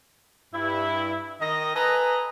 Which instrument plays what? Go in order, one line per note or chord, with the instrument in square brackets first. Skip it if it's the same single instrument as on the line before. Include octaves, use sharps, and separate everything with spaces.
[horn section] G2 E4
D#3 D#5
A4 B4 D#5 G#5 A#5